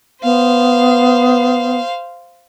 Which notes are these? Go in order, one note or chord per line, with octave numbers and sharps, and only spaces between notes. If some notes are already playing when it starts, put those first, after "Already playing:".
B3 C5 F5